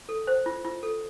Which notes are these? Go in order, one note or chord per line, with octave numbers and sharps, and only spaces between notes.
A4
C5
F4
F4
A4